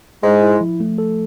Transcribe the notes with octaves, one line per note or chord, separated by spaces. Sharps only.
G#2 G#3 E4
E4
F3
A3
A4